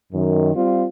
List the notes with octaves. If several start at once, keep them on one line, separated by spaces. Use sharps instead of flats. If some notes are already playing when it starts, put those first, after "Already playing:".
F#2 D#3
G3 C4 F4